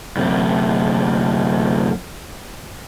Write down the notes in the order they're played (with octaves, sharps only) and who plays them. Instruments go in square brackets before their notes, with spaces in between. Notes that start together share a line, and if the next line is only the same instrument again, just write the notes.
[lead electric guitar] F#2 C3